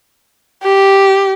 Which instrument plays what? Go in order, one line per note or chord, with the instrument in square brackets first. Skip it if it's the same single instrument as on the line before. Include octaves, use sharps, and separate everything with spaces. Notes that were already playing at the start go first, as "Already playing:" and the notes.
[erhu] G4